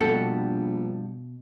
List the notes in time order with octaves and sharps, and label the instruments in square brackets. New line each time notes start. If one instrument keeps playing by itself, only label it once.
[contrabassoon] A#1 [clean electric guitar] G2 G4 F#5 [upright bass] B2 [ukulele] A4